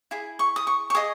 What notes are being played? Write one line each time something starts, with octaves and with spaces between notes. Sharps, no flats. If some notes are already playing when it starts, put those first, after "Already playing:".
E4 G#4
C#6
D#6
C#6
C#6
G#4 D#5 D#6